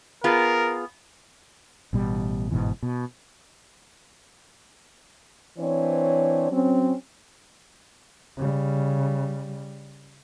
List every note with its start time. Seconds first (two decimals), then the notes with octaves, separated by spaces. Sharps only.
0.24 B3 F4 G#4 A#4
1.93 A1 B2 G3
2.51 G1 G#2 B2 E3
2.83 B2
5.59 E3 C4 D4 C5 C#5
6.51 F#3 C4 C#4
8.37 C#3 G3